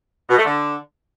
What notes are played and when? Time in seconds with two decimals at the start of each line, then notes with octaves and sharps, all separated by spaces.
0.29 B2
0.37 A3
0.45 D3